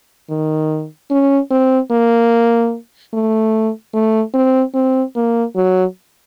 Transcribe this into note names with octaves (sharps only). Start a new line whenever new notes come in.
D#3
C#4
C4
A#3
A3
A3
C4
C4
A#3
F#3